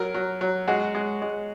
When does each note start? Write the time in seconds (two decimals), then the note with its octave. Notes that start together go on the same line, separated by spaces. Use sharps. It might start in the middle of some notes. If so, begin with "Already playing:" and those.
Already playing: F#3 A#4
0.14 F#3
0.41 F#3
0.68 G#3 F#4
0.95 G#3
1.22 G#3